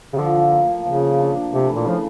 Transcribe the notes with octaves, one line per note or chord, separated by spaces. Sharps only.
C#3
D3 F3
F3
A#3
A#3
C#3 F3
F3
D4
D4
C3 A3
E3
A#2
C#3 F3